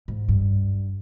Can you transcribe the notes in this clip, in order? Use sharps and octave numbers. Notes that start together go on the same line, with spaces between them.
G#2
G2